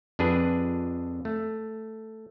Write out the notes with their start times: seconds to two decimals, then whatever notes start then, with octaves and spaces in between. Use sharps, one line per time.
0.19 F2 D4 G#4 B4
1.25 A3